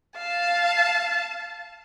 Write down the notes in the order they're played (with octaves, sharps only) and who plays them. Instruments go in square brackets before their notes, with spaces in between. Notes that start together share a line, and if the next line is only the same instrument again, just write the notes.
[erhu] F5 [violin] A5